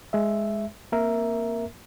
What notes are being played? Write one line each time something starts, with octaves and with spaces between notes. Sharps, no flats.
G#3 E5
A#3 C4 A#4 E5